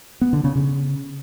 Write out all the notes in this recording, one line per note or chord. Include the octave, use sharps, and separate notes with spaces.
B3
D3
C#3
C#3